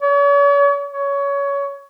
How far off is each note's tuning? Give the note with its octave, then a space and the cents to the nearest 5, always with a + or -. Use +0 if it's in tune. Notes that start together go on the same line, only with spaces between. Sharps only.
C#5 +40
C#5 +20